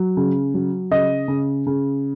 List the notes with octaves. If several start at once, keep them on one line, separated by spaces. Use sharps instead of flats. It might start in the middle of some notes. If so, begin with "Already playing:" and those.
Already playing: F#3
C#3
F#3
C#3 D#5
C#3
C#3